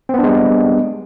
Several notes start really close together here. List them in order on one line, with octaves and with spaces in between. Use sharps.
C4 B3 D4 G#3 G3